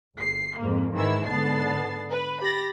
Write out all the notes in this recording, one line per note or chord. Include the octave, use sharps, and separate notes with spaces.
G1 C7
F2 G#2 A#3
G#2 D#3 E3 E4 E6
G#2 D3 B3 A5 A6 C7
B4
G4 B5 A6 A#6